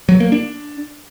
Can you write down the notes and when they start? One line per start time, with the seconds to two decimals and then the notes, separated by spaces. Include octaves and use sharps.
0.09 F#3
0.20 A#3
0.32 D4